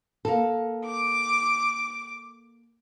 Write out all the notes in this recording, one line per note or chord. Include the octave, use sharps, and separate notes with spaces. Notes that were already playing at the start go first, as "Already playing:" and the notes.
A#3 A4
D6